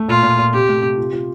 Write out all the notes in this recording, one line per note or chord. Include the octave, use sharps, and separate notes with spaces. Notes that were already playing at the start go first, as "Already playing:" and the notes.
Already playing: A3
A#2 F4
A#2
A#2
C3 G4
A3
C3
F4
F4